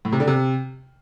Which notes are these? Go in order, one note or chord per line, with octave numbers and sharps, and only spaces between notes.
A2
C3
D3
C3